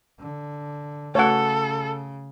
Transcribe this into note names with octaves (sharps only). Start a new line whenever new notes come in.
D3
C#3 A3 F#4 A4 C#5 F#5